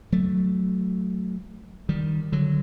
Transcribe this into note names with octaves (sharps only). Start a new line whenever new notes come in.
F#3 A3
D#3 G3
D3 F#3